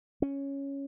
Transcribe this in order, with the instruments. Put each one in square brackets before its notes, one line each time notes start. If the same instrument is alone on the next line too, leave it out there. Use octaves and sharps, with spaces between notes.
[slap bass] C#4